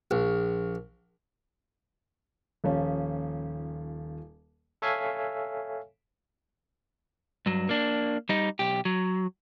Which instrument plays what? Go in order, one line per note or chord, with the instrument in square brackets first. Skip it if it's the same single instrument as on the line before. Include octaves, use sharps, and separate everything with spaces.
[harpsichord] A#1
[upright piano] D#1 F3 C#4
[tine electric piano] A4 C#5 E5 F5 G#5
[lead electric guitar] G2 F#3
A#3 D4
G3 D#4
B1 G4
F#3